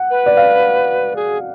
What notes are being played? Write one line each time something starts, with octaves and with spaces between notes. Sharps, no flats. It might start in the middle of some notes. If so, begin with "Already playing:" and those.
Already playing: F#5
B4
D5
F5
G#4